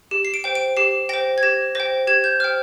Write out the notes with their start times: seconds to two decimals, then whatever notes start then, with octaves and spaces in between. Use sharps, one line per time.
0.11 G4
0.25 C7
0.34 D7
0.44 C5 G5
0.55 D7
0.77 G4 C7
1.09 C5 G5 A#6
1.38 G#6
1.43 G4 A#6
1.75 C5 G5 A#6
2.07 G4 G#6
2.24 G6
2.40 C5 G5 F6